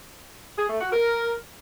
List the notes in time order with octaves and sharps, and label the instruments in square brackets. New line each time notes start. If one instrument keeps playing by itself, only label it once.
[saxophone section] G#4
A3
F#4
A#4